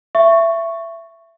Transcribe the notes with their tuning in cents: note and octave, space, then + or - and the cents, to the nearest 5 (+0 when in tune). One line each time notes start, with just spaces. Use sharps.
E5 +20 C#6 +0